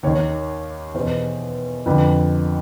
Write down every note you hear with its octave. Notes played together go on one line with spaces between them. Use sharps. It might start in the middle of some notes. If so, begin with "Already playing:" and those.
D#2 D#3 C#5
E2 B2 C5
F2 D3 B4